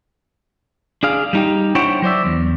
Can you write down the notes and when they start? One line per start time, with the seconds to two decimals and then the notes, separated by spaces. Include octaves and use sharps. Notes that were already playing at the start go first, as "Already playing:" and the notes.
1.03 D4 G#4 F5
1.33 G3 D#4 G4
1.75 D4 E4 C5 C#5 F#5 G5
2.02 F#3 C5 D5 E5
2.26 E2